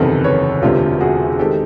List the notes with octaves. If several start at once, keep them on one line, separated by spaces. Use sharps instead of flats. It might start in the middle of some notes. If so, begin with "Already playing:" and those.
Already playing: F#1 E2 C3 D#3 A4 B4
B4 C#5
E1 D2 C3 F4 G4
F#4 G#4
D#3 G#3 C4 G4 A4